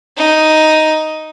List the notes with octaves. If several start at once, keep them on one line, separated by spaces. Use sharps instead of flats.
D#4